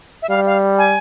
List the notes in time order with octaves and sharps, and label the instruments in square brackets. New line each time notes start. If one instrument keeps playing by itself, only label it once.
[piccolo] E5
[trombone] G3 [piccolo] F5
[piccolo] F5
G#5